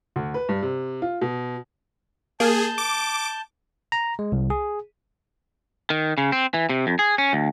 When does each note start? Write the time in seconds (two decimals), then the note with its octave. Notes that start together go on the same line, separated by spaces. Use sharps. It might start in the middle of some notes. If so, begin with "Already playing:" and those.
0.16 D2
0.34 B4
0.49 G2
0.62 C3
1.02 F4
1.21 B2
2.40 A#3 G#4 A5 G6
2.78 D6
3.92 A#5
4.19 G#3
4.32 C2
4.50 G#4
5.90 D#3
6.18 C#3
6.32 C4
6.54 E3
6.69 C3
6.87 F2
6.99 G#4
7.18 C#4
7.33 D2